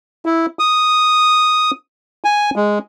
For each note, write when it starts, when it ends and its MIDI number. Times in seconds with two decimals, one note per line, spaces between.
0.26 0.46 64
0.59 1.71 87
2.24 2.50 80
2.56 2.79 56